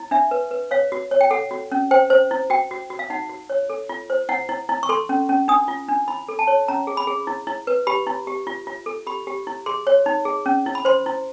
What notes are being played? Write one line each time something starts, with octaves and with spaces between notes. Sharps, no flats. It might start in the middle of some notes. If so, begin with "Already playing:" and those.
Already playing: E4
D4 E5
B4
B4
C#5 F5
F#4
C#5
G5
A4 F#5
F#4
C#4
C5 G5
C5
E4
F#4 G5
F#4
F#4
F5
D#4 F#5
F#4
C#5
A4
F4
C5
E4 F#5
E4
E4
C#6
A4 C6
C#4
C#4
D4 D#6
F4
D4
E4 B5
A4
A5
C#5
C#4 A#5
G#4
B5
G#4
E4
E4
B4
G4 B5
E4
G4
F4
F4
A4
G4 B5
G4
E4
G#4 C6
C#5
D#4
G#4
C#4
E4
B5
C5 C6
E4